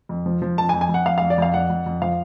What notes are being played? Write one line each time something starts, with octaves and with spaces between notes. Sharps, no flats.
F2
F3
F3
F2 A5
G#5
F2
G#5
F2
F#5
F2 F5
F2 F5
D5
F2 F5
F2 F#5
F2
F2
F3 F5